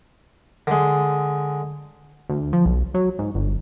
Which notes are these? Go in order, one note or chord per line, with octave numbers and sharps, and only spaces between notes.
D3 G#3
D2
F3
B1
F#3
G#2
G1